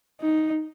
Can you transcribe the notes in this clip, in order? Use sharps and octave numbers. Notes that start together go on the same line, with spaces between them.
D#4